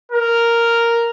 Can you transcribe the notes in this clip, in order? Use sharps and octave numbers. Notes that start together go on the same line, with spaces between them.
A#4